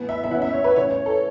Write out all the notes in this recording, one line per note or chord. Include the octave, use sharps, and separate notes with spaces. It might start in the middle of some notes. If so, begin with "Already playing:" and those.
Already playing: A2 E3 B3
E5
E5
E3 C#4 F#5
E5
C#5
B4
A2 E3 C#4 C#5
C#5
A4